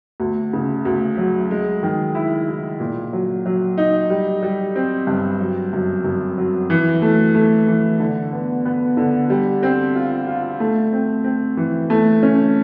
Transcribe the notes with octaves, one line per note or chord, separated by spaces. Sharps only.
D2
C#3
D2
F#3
G#3
D#3
E4
E4
A#2
F#3
F#3
D#4
G3
G3
C4
G2
F#3
F#2
F#2
F#3
E3
A3
A3
E3
D3
B3
B3
D3
G3
C4
F4
F4
A3
C4
C4
E3
A3
C#4